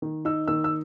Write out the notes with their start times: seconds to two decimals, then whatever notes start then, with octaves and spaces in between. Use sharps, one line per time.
0.02 D#3
0.25 D#4 E6
0.48 D#3 E6
0.64 E6